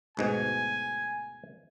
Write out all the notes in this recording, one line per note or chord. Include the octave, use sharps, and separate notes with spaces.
D2 G#2 B2 G#5